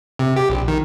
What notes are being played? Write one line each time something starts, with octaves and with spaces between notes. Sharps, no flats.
C3
G4
A#1
D#3